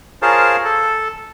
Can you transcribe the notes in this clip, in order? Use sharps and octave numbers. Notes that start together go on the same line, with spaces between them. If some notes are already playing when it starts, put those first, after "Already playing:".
F4 G#4 A#4 C5 C#5 A5
A4